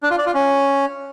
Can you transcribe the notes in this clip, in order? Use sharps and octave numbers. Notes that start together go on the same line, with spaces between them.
D4
F4
D5
F4
C#4